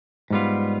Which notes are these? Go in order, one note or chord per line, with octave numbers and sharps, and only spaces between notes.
G#2 G3 B3 F4